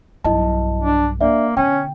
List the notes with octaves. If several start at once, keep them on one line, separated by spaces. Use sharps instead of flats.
B1 G2 E4 D#5 A5
D4
A#3 D4 D5 E5
B2 D3 C#4 G5